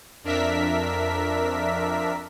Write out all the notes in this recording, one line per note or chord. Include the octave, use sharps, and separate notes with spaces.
F2 D4 A#4 E5 B6